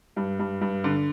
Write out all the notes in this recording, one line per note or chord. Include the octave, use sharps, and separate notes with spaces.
G2
G2
G2
D3